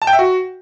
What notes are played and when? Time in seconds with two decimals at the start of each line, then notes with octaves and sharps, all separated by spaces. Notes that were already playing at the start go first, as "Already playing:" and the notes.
0.02 A5
0.07 G5
0.13 E5
0.19 F#4